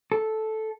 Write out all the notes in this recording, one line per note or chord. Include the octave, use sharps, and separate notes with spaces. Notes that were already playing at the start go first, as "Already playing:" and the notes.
A4